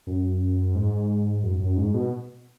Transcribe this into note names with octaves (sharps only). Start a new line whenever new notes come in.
F#2
G#2
F#2
F#2
G#2
B2